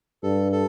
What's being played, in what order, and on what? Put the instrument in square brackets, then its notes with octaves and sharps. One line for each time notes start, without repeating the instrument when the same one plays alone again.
[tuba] G2 [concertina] A4
[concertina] A4